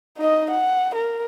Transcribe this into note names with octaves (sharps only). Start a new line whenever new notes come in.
D#4 D#5
F#5
A#4